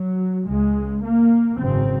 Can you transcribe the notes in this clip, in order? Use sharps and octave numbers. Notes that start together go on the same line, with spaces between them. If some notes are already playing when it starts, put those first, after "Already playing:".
Already playing: F#3
C#2 C#3 G#3
A#3
G#1 F#2 C#3 C4